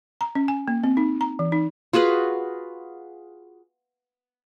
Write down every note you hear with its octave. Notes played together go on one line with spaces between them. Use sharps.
A#5
C#4
G#5
A#3
C4
D#4
A#5
E3
D#4
F4 F#4 G#4 B4